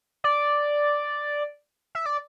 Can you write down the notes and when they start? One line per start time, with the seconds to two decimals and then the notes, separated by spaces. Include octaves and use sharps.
0.24 D5
1.95 E5
2.06 D5